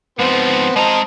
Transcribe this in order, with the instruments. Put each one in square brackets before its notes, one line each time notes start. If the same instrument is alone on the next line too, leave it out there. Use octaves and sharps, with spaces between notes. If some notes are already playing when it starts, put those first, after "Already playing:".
[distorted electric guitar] G#2 F3 [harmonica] B3 C4
[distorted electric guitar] G#3 A#5 [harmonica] C4 D#5 A5